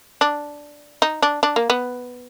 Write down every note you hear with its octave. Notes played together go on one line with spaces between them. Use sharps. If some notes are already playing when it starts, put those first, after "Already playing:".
D4
D#4
D4
D4
A#3
B3